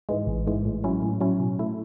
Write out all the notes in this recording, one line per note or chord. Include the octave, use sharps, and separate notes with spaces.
G#2 E3 G#3
A1
G#2 E3 G#3
A2
F#3 C#4 E4
A2
F#3 C#4 E4
B2
A3 E4